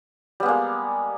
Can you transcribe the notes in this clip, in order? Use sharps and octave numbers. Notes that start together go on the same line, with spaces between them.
G3 G#3 A#3 B3